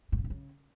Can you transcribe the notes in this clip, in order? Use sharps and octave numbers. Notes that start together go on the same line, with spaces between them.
A#2
C#3
G2
C#3